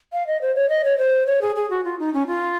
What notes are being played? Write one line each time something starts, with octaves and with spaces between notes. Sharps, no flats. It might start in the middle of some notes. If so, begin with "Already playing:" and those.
F5
D#5
C5
C#5
D#5
C#5
C5
C#5
G#4
G#4
F#4
F4
D#4
C#4
F4